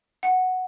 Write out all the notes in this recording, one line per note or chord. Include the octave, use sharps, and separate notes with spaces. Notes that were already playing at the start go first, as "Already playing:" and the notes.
F#5